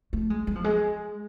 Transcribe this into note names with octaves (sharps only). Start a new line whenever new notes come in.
A3
G#3
G#3
F3
G#3